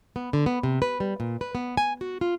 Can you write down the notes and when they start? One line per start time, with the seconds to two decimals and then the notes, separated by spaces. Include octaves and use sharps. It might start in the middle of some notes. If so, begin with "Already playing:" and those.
0.16 B3
0.33 D3
0.46 B3
0.63 C3
0.82 B4
1.00 G3
1.20 A#2
1.41 B4
1.55 B3
1.77 G#5
2.01 F#4
2.21 F4